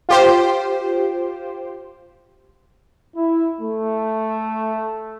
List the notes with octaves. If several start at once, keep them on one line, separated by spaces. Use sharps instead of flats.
F4 G4 C5
E4
A3